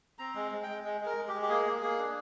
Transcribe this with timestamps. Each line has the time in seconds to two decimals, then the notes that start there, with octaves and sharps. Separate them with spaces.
0.19 C4 A#5
0.35 G#3
0.52 G#3
0.63 G#3 G5
0.84 G#3
1.01 G#3 A#4
1.17 G#3
1.28 G4
1.33 G#3
1.42 G4
1.49 A#3 G#4
1.66 A#3
1.82 A#3 G#4
1.98 D4